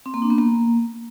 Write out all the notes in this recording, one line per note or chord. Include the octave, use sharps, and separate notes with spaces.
C4
A#3
D4
B3
A#3